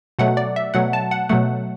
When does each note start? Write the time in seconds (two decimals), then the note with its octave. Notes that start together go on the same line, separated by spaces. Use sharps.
0.19 B2 F#3 A3 F#5
0.37 D5
0.56 E5
0.74 B2 F#3 A3 F#5
0.93 A5
1.11 F#5
1.29 B2 F#3 A3 F#5